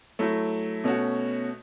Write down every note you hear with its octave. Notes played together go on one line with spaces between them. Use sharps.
F#3 A3 E4
B2 A3 C#4 F#4